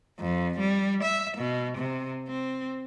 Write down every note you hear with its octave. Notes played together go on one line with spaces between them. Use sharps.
F2
G3
E5
B2
C3
C4